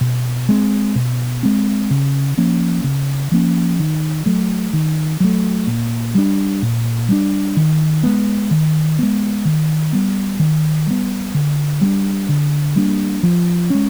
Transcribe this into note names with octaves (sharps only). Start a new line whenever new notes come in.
B2
G#3 C4
B2
G#3 C4
C#3
F3 A#3 C#4
C#3
F3 A#3 C#4
D#3
F#3 A3
D#3
F#3 A3
A#2
G3 B3 D4
A#2
G3 B3 D4
D#3
G#3 B3
D#3
G#3 B3
D#3
G3 B3
D#3
G3 B3
D3
G3 A#3 D4
D3
G3 A#3 D4
F3
G#3 C#4